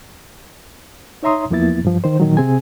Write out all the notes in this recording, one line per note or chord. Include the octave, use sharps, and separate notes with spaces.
D#4 C#5 E5 A#5 C6 D#6
E2 F3 A#3 B3 E4 A6
G2 F3
D#3 C5
A#2 D#3 F#3
C3 C4 G#4 G#5